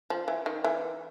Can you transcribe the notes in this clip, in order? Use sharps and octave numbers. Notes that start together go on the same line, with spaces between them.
F3
E3
D#3
E3